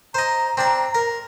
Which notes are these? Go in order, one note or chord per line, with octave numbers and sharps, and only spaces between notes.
C5 D#5 A#5
C4 D4 D5
A#4